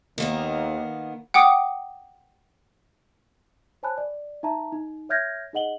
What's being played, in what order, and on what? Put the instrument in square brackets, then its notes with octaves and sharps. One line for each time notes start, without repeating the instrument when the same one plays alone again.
[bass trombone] D#2 [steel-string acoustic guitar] D#3 A#3 B3
[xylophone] F#5 G5 D6 D#6
[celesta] C5 C#5 G#5 A5 B5 F#6
D5
D#4 E5 A5 A#5
D#4
C#5 E5 F6 G6 G#6 A#6
D#4 G#4 D#5 F#5 F#7 G7